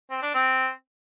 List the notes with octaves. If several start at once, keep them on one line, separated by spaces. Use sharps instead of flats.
C4
D4
C4